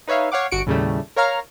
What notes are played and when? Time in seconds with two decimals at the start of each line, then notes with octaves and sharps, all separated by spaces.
0.08 D#4 B4 C#5 E5 F5
0.32 C#5 F5 F#5 D6
0.51 G1 F#4 C#7 D7
0.66 D#2 A2 C#3 G3 A3
1.16 A#4 C#5 F5 A#5 F6